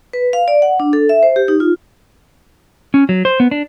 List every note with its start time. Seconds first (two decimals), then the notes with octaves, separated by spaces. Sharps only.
0.13 B4
0.33 F5
0.48 D5
0.62 F#5
0.80 D4
0.93 A4
1.09 E5
1.23 C5
1.36 G4
1.48 D#4
1.60 F4
2.94 C#4
3.09 F#3
3.25 C5
3.40 B3
3.51 D4